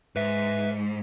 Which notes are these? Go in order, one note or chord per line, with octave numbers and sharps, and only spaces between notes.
G#2 B4 E5